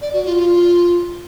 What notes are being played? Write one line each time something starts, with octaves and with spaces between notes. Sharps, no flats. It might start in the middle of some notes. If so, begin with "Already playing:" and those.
D5
F#4
F4
F4